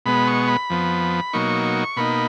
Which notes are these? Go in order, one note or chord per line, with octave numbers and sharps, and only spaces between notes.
B2 G#3 B3 B5
C#6
B5
F2 F3 B3
B2 F#3 A#3 D#4 C#6
B2 A#3 D#4 B5